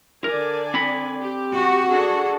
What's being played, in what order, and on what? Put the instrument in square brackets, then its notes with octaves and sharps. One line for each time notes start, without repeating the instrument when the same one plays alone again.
[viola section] D3 D5 G#5 [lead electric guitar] A#4
[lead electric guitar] C4 B5
[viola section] G4
[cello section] F#4
[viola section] D4 G#4 A4